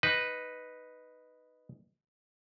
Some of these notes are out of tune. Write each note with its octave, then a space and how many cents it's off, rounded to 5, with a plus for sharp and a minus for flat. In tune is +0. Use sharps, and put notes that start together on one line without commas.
D#4 +0 B4 +0